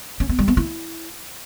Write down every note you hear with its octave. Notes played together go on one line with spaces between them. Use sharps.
C#4
B3
G3
B3
E4